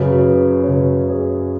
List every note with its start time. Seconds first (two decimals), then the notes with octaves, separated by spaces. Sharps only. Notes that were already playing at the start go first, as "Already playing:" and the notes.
Already playing: F#2 C#3 F#3 B4
0.18 C#5
0.28 B4
0.64 C#5
0.68 F#2 C#3 F#3 B4
1.09 G#4 C#5